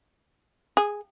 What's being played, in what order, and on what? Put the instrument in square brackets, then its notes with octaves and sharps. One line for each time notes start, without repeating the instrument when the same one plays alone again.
[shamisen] G#4